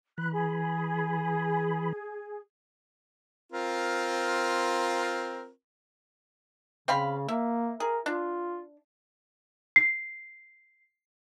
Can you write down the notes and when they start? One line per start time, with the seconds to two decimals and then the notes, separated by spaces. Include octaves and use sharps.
0.18 E3 B5 F#6
0.32 G#4
3.52 C4 F4 A#4
6.88 C#3 C4 F5 B5
7.28 A#3 E5
7.80 G#4 A#4
8.06 D4 F4
9.76 C7